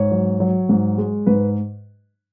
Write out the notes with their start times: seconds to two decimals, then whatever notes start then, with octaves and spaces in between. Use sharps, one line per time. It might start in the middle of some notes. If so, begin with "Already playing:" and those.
Already playing: G#2 C#5
0.12 F#3
0.40 F#3
0.69 G#2
0.98 G#3
1.26 G#2 B4